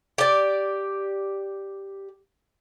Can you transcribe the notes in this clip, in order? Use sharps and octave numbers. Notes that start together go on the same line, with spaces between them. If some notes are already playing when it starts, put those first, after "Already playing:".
G4 D5